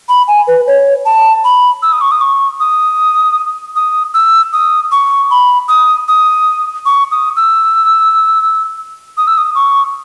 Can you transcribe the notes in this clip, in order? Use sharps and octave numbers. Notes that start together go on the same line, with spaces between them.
B5
G#5
B4
C#5
A5
B5
E6
D#6
C#6
D#6
C#6
D#6
D#6
E6
D#6
C#6
B5
D#6
D#6
C#6
D#6
E6
D#6
E6
D#6
C#6